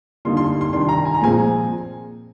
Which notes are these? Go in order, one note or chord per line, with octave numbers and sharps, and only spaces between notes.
D3 G3 A#3 D#4 C6
C6
C6
C3 D#3 G3 D4 C6
A#5
G#5
A#5
A#2 F3 G#3 C4 G#5